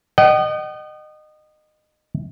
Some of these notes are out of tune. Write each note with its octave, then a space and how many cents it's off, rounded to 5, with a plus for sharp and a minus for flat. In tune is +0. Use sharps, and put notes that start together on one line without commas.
D#5 -25 F#5 +45